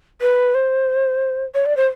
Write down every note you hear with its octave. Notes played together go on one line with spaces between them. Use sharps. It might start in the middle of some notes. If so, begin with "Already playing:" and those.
B4
C5
C#5
D5
C5